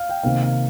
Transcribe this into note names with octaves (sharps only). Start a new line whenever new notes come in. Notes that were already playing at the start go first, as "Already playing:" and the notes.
Already playing: F5
G5
C3 D#3 A#3 F5
F5